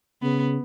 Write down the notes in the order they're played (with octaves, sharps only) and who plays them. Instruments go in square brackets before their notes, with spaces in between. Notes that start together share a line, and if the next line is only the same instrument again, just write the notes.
[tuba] C#3 [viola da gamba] B3